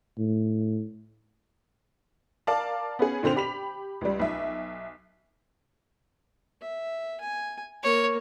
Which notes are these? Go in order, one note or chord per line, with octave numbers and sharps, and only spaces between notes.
A2
A#4 D5 F5 A5
B3 C#4 G#4
A#2 D3 C4 C6 F7
G4 B5 B6 F7
C#2 G3
B1 E5
E5
G#5
A#3 C#5